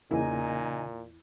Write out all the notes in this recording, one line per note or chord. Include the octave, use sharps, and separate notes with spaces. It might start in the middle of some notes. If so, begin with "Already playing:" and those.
E2 A#2 C#3 A#3 D#4 E4 D#5 G#5